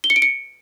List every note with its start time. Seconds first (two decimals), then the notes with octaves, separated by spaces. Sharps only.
0.04 G7
0.10 C#7
0.16 D7
0.22 C#7